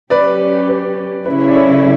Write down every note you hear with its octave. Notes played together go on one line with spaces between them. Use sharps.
F#3 C#4 G4 B4 D5
B4
C#3 F#3 C#4 E4 B4
D5
A4 C#5